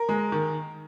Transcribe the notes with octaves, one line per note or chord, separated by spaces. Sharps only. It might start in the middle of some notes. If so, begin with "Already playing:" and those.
Already playing: A#4
G#3
D#3